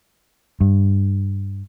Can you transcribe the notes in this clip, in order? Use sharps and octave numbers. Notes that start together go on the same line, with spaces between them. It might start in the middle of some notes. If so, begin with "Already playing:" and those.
G2